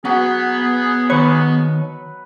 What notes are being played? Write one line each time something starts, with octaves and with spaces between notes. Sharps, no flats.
F#3 B3 G#4 F#5
D#3 B4 C#5